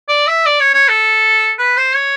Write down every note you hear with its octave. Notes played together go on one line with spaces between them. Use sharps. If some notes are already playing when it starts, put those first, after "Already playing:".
D5
E5
D5
C#5
C#5
A4
B4
C5
C#5